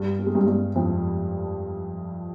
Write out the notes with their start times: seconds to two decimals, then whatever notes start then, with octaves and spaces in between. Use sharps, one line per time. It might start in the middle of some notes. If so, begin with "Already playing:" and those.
Already playing: G2 G3
0.19 G3
0.27 G#3
0.35 G2 G3
0.47 G2 G3
0.76 F2 F3